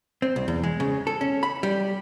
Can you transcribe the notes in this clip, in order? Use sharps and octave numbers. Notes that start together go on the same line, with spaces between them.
C4
C2
E2
G#3
C#3
A4
C#4
B5
G3